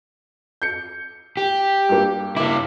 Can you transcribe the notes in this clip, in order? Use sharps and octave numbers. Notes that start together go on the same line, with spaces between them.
G6 C#7
G4
G2 A#3
A#3 E4 D6